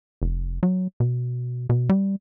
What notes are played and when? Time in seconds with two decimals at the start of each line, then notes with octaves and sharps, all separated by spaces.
0.22 F1
0.63 F#3
1.00 B2
1.69 B2
1.89 G3